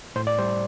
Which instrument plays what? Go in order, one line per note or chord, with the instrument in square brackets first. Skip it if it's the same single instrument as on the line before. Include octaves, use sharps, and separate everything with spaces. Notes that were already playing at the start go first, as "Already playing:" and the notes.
[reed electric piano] A2 C5
D5
G3 C5